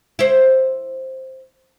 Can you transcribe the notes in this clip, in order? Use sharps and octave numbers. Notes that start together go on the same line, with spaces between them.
E4 C5